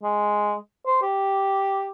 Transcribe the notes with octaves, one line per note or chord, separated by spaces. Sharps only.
G#3
C5
G4